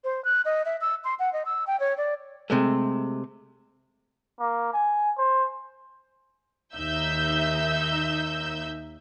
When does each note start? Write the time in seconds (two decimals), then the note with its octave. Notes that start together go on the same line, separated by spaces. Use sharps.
0.04 C5
0.25 F#6
0.45 D#5
0.65 E5
0.81 E6
1.04 C6
1.19 F#5
1.33 D#5
1.46 E6
1.67 G5
1.80 C#5
1.97 D5
2.50 C3 G#3 A3
4.40 A#3
4.74 G#5
5.18 C5
6.75 D#2 D#4 E5 E6 G6